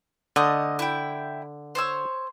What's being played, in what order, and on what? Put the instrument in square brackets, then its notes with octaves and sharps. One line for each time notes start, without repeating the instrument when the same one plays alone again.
[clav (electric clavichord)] D3 [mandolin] A3 D#5
[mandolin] E4 G5
C5 C#5 E6